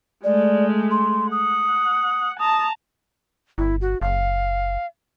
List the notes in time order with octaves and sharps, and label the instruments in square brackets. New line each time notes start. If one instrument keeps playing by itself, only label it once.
[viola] G#3 A3 [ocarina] D5
[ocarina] C6
[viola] F#5 [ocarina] D#6
[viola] A5 A#5 [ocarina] D#6
[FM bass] G1 [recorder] E4
[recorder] F#4
[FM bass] F#1 [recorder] F5